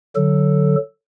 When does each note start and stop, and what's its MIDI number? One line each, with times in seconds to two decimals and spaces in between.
0.16 0.76 50
0.16 0.76 54
0.16 0.76 69